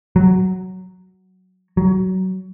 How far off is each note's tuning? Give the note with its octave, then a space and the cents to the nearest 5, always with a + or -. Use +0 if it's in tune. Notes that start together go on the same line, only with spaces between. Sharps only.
F#3 +5
F#3 +20